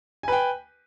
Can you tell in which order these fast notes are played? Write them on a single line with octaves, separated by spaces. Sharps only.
G#5 B4 G5